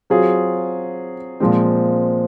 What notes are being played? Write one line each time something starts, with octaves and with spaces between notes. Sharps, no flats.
F#3 C4 F4 G#4
A#2 F3 G#3 C4